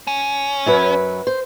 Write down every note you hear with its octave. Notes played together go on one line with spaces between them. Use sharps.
C#4
F#2 F#3 B4
C5